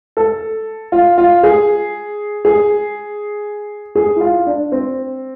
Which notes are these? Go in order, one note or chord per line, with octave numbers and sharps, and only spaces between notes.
A4
F4
F4
G#4
G#4
G#4
E4
F4
D4
C4